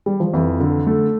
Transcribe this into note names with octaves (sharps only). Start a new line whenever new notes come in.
G3
F3
F2 E3
D3
A3